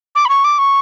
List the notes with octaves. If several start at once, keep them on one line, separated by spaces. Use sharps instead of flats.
D6
B5
C#6
D6
C#6